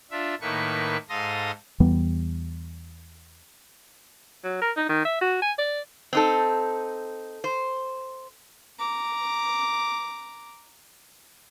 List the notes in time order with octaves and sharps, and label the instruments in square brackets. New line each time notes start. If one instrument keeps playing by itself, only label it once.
[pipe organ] D4 F4 E5
A2 D#3 A3 A#3 B4 C#6
G#2 A4 F5 C6 D#6 A#6
[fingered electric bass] E2 E3 G3 B3
[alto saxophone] F#3
A#4
D#4
D#3
E5
F#4
G#5
D5
[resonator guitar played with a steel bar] C4 D#4 A4
C5
[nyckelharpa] A#5 D6